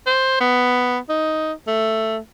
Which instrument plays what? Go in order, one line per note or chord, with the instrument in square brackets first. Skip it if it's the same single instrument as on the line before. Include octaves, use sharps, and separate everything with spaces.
[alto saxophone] C5
B3
D#4
A3